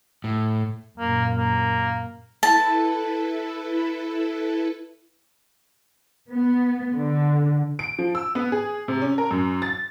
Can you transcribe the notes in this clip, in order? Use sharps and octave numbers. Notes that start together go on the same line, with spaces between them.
A2
F#2 A#2 A#3
A#3
E4 A4 B4 A5
B3
D3
D7
F3
E6
B3
G#4
C3
C#4
A#4
F#2
A6